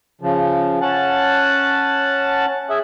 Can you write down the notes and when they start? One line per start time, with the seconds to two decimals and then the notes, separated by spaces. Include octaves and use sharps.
0.21 C#3 F3
0.81 C#4 F#5 A5
2.70 G#4 E5